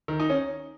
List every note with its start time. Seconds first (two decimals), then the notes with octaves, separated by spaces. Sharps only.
0.08 D#3
0.20 D#4
0.30 C#4